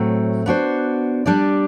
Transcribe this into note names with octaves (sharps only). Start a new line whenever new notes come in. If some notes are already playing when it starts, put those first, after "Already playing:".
Already playing: A2 F#3 A3 C4
B3 D4 F#4 C5
G3 D4 G4 D5